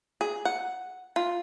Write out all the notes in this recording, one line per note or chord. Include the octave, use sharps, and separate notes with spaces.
G#4
F#5
F4